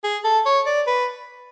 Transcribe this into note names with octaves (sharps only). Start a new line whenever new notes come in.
G#4
A4
C#5
D5
B4